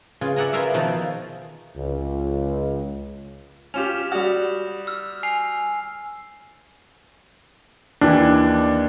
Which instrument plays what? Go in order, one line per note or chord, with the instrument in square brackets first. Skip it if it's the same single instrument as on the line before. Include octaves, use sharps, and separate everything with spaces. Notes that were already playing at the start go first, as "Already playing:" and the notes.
[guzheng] C#3 F4 G#4 B4
D5 E5 F#5 G#5 A#5
F4 G#4 A#4 B4 E5 F5
B2 D#3 F3 B4 A5 A#5
[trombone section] C#2
[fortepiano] C#4 F4 G4 [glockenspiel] E7 F7
[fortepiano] G3 F#4 [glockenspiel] D#6 F7
[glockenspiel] E6 F6
G#5 C7 F7
[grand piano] D#2 E3 [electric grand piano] D4